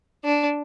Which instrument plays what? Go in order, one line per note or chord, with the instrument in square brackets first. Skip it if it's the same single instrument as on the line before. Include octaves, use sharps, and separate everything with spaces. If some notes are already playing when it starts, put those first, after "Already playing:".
[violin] D4